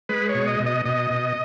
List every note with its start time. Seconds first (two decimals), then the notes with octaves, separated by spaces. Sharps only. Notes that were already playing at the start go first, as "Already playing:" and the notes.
0.09 G#3 B4
0.29 C#5
0.35 B2
0.47 D#5
0.60 B2
0.66 D#5
0.85 B2 D#5
1.11 B2